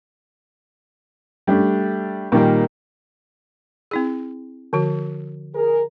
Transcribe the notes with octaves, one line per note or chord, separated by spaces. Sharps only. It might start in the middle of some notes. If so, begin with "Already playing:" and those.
G3 A3 D4
A#2 D#3 G3 A#3
C4 E4 G#4
D3 F3 F#4
G#4 A#4